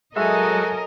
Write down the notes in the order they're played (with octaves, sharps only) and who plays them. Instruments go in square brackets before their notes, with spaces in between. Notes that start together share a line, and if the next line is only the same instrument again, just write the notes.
[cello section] F#3 A#4 D#5 [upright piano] G#3 E5 [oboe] F#4 [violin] A4 G#5